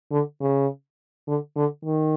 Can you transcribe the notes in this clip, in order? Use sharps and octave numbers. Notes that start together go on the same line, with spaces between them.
D3
C#3
D3
D3
D#3